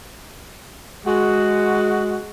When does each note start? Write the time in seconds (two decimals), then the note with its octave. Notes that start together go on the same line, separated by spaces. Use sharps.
1.04 G#3 F#4